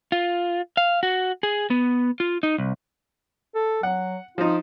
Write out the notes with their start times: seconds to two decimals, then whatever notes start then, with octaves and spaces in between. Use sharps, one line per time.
0.12 F4
0.77 F5
1.03 F#4
1.43 G#4
1.70 B3
2.20 F4
2.43 D#4
2.58 C2
3.55 A4
3.83 F#3 F#5
4.38 F3 D#4 F4